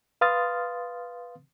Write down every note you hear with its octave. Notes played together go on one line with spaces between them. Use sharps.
B4 F5 C6 D#6 F6 A6